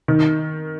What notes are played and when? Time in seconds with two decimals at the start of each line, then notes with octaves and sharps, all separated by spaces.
0.08 D#3